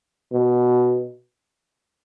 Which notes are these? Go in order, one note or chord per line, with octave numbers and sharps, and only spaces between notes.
B2